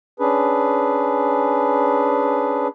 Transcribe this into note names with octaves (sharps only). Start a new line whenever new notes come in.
C#4 D4 G#4 B4